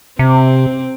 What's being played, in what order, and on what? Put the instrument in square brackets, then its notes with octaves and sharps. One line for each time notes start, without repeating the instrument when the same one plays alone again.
[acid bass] C3 [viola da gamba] C4